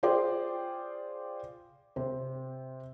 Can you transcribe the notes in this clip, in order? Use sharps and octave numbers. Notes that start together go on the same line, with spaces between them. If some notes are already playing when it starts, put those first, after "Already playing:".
F4 G#4 C5 D5 G5
C3 C5